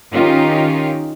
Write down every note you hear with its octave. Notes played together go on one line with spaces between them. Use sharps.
D#3 C#4 D#4 F4 G4